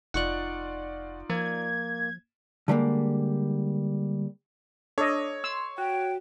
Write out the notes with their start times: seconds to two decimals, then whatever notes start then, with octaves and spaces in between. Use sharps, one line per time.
0.14 F1 D#4 F4 D5 F#5 C#6 F#6
1.30 F3 A#3 G#6
2.68 D3 G3 G#3 A#3
4.98 D4 A4 C#5 D#5
5.44 C6 E6
5.78 F#4 G5